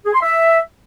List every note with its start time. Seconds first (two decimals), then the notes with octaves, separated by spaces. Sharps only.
0.05 G#4
0.14 C6
0.22 E5